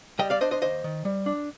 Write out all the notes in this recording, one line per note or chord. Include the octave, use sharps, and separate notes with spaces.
G3 D#5 G5
D5 F5
D4 C5 D#5
C5 D#5
D#2 C5 D#5
D#3
G3
D4